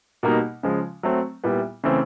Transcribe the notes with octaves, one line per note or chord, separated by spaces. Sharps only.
B2 G3 A#3 D#4
C#3 F3 G#3
F#3 A3 C4
A#2 G3 B3 E4
C#3 E3 A3 C4